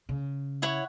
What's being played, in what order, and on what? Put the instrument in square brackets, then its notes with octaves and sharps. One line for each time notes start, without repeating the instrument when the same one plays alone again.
[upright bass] C#3
[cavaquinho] E4 C#5 F#5